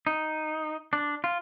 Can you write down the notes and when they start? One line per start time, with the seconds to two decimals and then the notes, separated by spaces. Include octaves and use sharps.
0.07 D#4
0.93 D4
1.24 F4